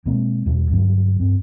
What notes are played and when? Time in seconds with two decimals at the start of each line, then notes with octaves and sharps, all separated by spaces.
0.06 B2 G#3 A#3 C4
0.46 E2 B2 G3
0.71 G2 D3 F#3 G3
1.20 G2 C4